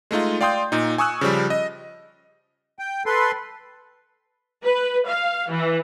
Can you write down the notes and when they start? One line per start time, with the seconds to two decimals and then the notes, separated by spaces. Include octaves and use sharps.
0.11 G#3 A3 D#4 F4
0.41 D5 F5 G5 C6 D#6 G6
0.72 A#2 D#4
0.98 G#5 C#6 D#6 E6 F#6
1.21 C#3 F3 G3
1.50 D#5
2.79 G5
3.06 A4 B4 C6
4.64 B4
5.07 F5
5.50 E3